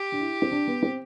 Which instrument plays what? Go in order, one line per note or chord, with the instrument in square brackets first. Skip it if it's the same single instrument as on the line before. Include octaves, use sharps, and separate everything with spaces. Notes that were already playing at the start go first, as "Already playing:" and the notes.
Already playing: [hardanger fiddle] G4
[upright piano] D4
E4
C4
D4
B3
C4